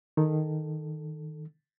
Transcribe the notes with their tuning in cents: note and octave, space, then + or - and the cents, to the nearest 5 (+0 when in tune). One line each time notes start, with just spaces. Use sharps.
D#3 +0 A4 +0